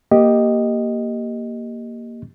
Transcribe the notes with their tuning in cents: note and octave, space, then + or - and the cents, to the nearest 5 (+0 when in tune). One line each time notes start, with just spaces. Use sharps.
A#3 +0 G4 +0 D#5 +0